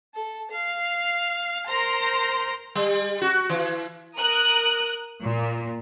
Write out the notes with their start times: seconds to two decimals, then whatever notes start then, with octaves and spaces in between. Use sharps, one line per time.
0.15 A4
0.52 F5
1.66 A#4 C5 A#5 C6
2.75 G3
3.22 F#4
3.49 E3
4.17 A#4 D#6 F#6
5.23 A#2